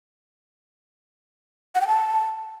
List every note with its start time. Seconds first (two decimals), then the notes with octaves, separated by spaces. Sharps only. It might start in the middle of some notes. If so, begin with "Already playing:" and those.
1.75 F#5
1.81 G5
1.87 A5